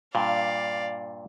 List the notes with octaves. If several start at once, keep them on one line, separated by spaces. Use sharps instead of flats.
G2 A#2 D5 F5